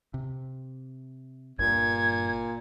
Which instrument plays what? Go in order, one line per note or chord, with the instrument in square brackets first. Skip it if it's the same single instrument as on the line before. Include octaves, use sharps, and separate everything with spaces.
[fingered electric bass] C3
[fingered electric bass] G1 G2 [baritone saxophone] A#2 [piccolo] G#6